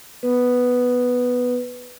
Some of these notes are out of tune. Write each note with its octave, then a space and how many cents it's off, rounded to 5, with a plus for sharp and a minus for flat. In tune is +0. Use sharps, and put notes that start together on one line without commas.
B3 +0 B4 +0